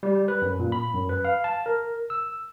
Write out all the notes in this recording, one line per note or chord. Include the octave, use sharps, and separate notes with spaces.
G3
B4
F#2
A#2
B5
F#2
B4
F5
A5
A#4
E6